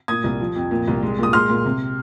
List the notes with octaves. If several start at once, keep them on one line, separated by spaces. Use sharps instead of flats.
A#2 D#6 G#6
C2
F3
F2
A#2
C2
G#3
A#2 D#6
G#3 C6 F6
A#2
C3